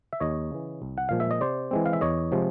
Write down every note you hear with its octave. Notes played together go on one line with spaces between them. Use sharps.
E5
D#2 C#5 D#5
C#3 E3
C2
F#5
A#2 F3 G#3 F5
E5
D#5
C3 C5 D5
E3 G#3 C4
F5
E5
E2 C#5 D#5
C3 F3 G#3